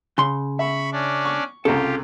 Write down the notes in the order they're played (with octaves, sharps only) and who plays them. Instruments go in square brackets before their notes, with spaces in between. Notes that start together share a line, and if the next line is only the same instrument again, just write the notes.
[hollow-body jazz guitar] C#3 C6
[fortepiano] E5 [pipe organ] B5 C#6
[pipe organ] C#4 D4 D5
[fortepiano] C#6
[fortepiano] C2 C#3 [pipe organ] F4 G4 [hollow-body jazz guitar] A4